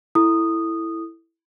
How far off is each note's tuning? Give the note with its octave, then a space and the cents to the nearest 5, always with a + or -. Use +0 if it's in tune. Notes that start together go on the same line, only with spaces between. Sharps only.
E4 +0 A4 +15 D#6 -10